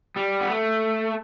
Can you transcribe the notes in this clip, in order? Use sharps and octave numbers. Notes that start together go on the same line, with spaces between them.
G3
B3
A3